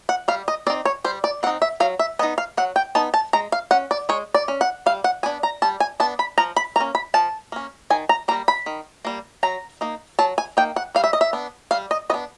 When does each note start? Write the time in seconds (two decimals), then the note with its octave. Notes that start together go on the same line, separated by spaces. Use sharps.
0.09 F#5
0.28 G3 F5
0.48 D#5
0.67 C4 D5
0.70 D#4
0.85 C#5
1.04 G3 C5
1.24 D5
1.43 C4 F#5
1.47 D#4
1.62 E5
1.80 F#3 F5
1.99 E5
2.19 B3 D#4 D#5
2.38 F5
2.57 F#3 F#5
2.76 G5
2.95 B3 D#4 A5
3.14 A5
3.33 G#3 A#5
3.52 F5
3.71 C#4 F#5
3.91 D5
4.09 G#3 C#5
4.34 D5
4.48 C#4
4.61 F#5
4.86 G3 F5
5.04 F#5
5.23 B3 D4 G#5
5.43 A#5
5.62 G3 A5
5.80 G#5
6.00 B3 D4 A5
6.19 B5
6.38 F3 A#5
6.56 B5
6.76 A#3 C#4 A#5
6.95 B5
7.14 F3 A5
7.52 A#3 C#4
7.90 D#3 G#5
8.09 A#5
8.28 G3 A#3 A#5
8.48 B5
8.66 D#3
9.05 G3 A#3
9.43 F#3 A#5
9.81 A#3 D#4
10.19 F#3 A5
10.38 G#5
10.57 A#3 D#4 G5
10.76 F#5
10.95 G3 F5
11.04 E5
11.13 D#5
11.21 E5
11.33 B3 D4
11.71 G3 F5
11.91 D#5
12.10 B3 D#5
12.14 D4